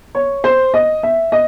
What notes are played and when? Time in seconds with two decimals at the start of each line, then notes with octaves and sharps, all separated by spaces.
0.15 C#5
0.44 C5
0.74 D#5
1.03 E5
1.32 D#5